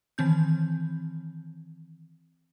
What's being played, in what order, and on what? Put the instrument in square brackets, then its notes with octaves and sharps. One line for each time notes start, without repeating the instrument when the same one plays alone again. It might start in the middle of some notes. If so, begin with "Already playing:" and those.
[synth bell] D#3 E3 C4 G6